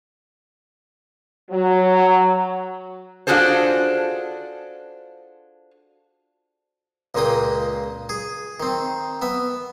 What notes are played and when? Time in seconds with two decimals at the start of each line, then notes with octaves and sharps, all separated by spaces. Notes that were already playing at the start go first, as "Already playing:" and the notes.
1.51 F#3
3.27 D4 F4 F#4 G#4 A4 C5
7.15 C#2 A#2 G#3 A#3 G5 D#6
8.09 G#4
8.60 D#3 C4
9.22 B3 E5